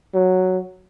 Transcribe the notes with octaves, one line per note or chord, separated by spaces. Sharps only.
F#3